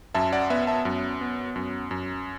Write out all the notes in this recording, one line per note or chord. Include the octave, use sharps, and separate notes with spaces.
F#2 E5 A5
D5 F#5
B3 B4 E5
E5 A5
F#2
B3
F#2
F#2